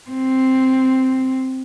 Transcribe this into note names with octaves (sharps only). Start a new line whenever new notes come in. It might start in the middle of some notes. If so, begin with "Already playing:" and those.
C4